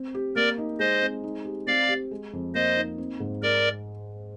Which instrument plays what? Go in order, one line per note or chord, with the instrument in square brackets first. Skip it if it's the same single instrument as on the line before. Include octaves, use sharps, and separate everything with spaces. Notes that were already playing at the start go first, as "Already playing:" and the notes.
Already playing: [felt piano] C4
G4
[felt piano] A#3 [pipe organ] A#4 D5
[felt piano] D#4
[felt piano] G#3 [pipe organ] C5 D#5
[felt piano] C4
D#4
G4
[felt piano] C4 [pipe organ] D5 F5
[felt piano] G4
G#3
F2
[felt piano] A#3 [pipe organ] C5 D#5
[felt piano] D#4
C4
G#2
[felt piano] G#3 [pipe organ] A#4 D5